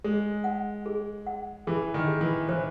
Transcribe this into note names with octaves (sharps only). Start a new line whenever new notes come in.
G#3 G#4
F#5
G#4
F#5
E3 G#4
D#3
G#4
E3
E3 C5